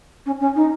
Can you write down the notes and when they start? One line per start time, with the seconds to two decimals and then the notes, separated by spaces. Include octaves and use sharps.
0.26 C#4
0.40 C#4
0.55 D#4